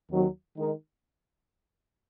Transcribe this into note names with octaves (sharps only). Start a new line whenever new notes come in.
D#2 D#3 F#3 C4
D#3 G#3 D#4 A#4